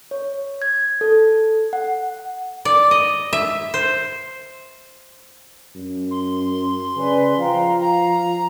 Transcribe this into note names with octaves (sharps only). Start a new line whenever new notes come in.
C#5
G#6
A4
F#5
D5
D#5
E5
C5
F#2
C6
C#3 B4 D5 G#5
F3 F5 G5 A#5
F5 A#5